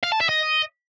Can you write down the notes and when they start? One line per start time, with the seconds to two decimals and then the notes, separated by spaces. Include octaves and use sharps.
0.03 F5
0.12 A5
0.20 E5
0.29 D#5